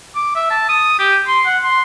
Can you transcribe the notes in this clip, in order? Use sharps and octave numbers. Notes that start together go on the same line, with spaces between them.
D6
E5
A5
D#6
G4
C6
F#5
C6